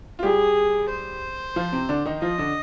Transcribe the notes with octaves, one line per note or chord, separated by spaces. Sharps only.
F4
G3 G4 G#4
C5
F3 F4
C3 C4
D3 D4
D#3 D#4
F3 F4 D#5
D3 D4